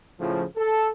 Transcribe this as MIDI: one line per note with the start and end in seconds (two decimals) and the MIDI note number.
0.20 0.44 45
0.20 0.44 49
0.20 0.44 53
0.56 0.89 69